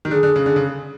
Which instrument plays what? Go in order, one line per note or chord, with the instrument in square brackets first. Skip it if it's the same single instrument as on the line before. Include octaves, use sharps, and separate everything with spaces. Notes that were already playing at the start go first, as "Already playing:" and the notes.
[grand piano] D#3 [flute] G4
[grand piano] D3 [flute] G#4
[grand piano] D3
C#3
D3
C#3